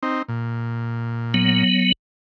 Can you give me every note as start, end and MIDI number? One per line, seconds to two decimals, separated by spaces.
0.03 0.22 60
0.03 0.22 63
0.29 1.63 46
1.34 1.92 54
1.34 1.92 59